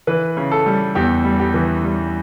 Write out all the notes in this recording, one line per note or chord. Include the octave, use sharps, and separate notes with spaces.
E3 B4
C#3
A4
G3
E2 G4
G3
G4
E3
G3